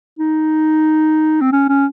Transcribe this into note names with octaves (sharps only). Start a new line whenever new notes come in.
D#4
C4
C#4
C#4